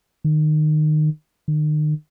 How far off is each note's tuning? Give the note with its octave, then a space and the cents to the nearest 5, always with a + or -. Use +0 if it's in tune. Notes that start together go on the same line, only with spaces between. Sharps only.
D#3 -25
D#3 -40